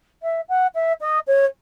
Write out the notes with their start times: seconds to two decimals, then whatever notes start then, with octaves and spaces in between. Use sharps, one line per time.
0.23 E5
0.49 F#5
0.75 E5
1.01 D#5
1.27 C#5